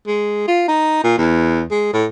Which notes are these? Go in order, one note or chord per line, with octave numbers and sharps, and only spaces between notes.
G#3
F4
D#4
A#2
E2
G#3
A2